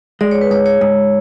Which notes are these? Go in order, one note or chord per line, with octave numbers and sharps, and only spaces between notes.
G#3 D5
C#5
B4
G#2 C#5
C#5
G#2